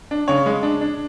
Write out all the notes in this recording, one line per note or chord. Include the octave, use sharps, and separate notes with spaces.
D4
C#3 C#5
G#3
D4
D4